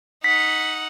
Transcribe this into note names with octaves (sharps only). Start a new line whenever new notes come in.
D#4 F#5 B6